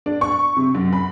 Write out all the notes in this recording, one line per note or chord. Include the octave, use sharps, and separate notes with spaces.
D4
C#6
C3
F#2
B5